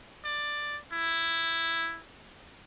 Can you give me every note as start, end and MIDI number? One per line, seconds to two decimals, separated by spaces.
0.25 0.78 74
0.93 2.00 64